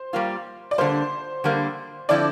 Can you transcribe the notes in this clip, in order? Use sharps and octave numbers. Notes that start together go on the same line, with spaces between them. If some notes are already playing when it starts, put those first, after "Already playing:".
Already playing: C5
G3 A#3 F4
D5
D3 G3 A#3 C5
D3 G3 A#3
D3 F3 C4 E4 D5